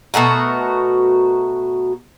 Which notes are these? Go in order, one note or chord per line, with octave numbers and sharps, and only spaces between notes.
B2 A3 F#4 A#4